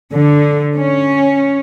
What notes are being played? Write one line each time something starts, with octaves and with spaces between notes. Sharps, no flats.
D3
C#4